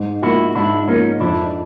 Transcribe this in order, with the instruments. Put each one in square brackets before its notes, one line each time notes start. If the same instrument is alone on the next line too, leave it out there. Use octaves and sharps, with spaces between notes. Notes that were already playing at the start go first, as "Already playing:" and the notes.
Already playing: [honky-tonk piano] G#2
[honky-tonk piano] F3 A#3 [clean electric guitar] E4 F#4
[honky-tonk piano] G#2 [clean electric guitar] D4 E4
[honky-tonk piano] F3 A#3 [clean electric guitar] C#4 D#4
[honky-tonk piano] F2 [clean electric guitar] D4 E4